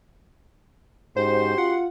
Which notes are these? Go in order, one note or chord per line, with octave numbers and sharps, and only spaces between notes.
G#2 C#4 F#4 G4 C5 C6
F4 F#5